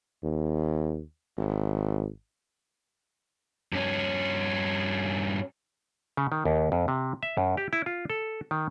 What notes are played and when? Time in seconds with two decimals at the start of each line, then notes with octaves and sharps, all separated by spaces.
0.24 D#2
1.38 G#1
3.73 G2 C#4
6.17 C#3
6.32 D#3
6.45 D#2
6.72 F2
6.88 C3
7.23 E5
7.37 F#2
7.57 G4
7.73 E4
7.86 F4
8.10 A4
8.51 D#3